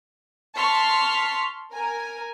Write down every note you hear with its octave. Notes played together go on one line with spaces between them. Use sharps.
A5 C6 C#6 F6 B6
A#4 G#5